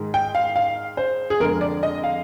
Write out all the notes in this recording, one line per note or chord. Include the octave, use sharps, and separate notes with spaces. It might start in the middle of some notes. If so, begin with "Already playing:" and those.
Already playing: G#2 D#3 G#3
G5
F5
F5
C5
G#4
F2 D3 G#3 A#4
D5
D#5
F5